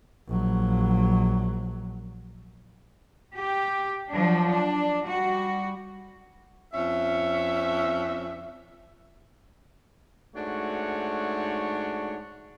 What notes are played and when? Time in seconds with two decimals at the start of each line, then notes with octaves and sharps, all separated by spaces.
0.27 A#1 F#3
3.36 G4
4.10 F3 F#3 D4
4.51 D4
5.04 G3 F#4
6.73 F2 C#4 E5
10.35 G#2 A3 D4 F#4 C#5